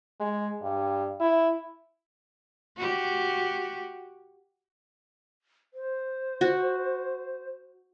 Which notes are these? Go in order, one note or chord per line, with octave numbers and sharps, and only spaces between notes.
G#3
G2
E4
F#4 G4
C5
F#4